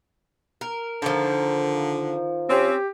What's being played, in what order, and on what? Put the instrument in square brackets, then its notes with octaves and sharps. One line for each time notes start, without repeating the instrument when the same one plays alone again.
[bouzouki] A#4
[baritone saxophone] D3 [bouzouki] D#3 F3
[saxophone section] C4 C#4 [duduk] G4